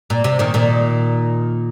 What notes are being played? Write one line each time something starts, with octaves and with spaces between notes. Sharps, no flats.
A#2
C3
A#2 D#3
A#2 D#3